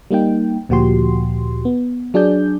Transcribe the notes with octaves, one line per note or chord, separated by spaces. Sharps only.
G3 A#3 D#4 G5
D2 A#2 F3 F#4 G4 C6
B3
F#3 D4 G#4 D5 G6